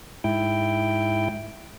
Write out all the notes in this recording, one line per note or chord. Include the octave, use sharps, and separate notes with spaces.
G#2 E4 G5